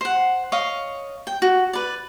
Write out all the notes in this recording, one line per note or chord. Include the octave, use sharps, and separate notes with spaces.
C5 F#5
C#5 D#5 F5
G5
F#4
B4 D5